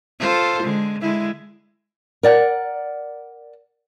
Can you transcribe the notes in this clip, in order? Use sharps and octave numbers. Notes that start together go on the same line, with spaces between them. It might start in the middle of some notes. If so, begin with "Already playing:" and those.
F4 A4 C5
D3 G#3
D3 G#3 E4
A#4 D5 F#5